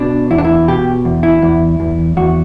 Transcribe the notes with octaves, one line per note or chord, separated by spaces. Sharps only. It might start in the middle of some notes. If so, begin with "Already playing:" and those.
Already playing: B2 D4
E2 E4
D4
E4
B2 G4
E2
E4
E2
E2
E2 F#4